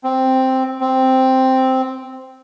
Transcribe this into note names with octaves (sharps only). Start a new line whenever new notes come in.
C4
C4